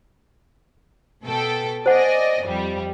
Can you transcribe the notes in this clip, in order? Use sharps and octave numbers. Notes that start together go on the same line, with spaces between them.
B2 A4 G5
C5 D5 D#5 F#5 G#5
F2 G3